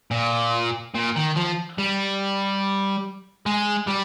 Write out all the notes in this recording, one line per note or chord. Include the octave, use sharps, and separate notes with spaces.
A#2
A#2
D#3
F3
G3
G#3
G3